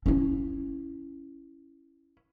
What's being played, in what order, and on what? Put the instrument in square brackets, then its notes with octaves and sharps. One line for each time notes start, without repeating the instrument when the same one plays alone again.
[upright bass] C#4 E4